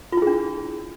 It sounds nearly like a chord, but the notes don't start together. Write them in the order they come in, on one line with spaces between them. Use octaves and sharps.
F4 E4 G#4 D4